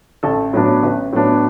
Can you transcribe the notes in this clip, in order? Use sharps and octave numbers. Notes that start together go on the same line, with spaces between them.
A1 A4
A2 F#3 B3 D4
A1 B4
A2 F#3 B3 D4